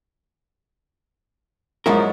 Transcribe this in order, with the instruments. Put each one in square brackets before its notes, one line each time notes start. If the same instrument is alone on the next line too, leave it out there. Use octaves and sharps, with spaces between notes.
[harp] G#2 F#3 [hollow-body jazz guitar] F3 E4 A#4